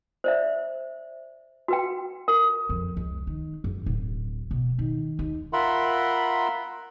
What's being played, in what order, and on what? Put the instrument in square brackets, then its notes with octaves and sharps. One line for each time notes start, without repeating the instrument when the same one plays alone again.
[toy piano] C5 D5 E5
F#4 B4 G5
A#4
[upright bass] F2
C#2
D#3
F#1
D1
B2
D#3
D#2
[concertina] F4 A#4 E5 F#5 B5 C6